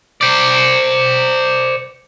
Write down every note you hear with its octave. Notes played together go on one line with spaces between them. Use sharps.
C5 D5